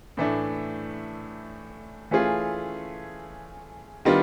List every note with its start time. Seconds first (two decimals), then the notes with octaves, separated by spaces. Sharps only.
0.17 A2 E3 A3 D4
2.11 E3 A3 C#4 F4 G#4
4.05 D#3 G3 B3 D4 F4